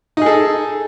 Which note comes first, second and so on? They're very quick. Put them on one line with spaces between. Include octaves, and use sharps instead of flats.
D#4 G#4 A4